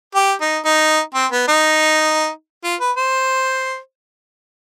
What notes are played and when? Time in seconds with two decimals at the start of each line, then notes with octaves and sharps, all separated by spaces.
0.15 G4
0.41 D#4
0.65 D#4
1.14 C4
1.32 B3
1.48 D#4
2.64 F4
2.80 B4
2.97 C5